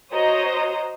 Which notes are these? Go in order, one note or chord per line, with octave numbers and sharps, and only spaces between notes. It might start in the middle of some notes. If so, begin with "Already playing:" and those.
F#4 C5 C#5 D#5 A#5 D#6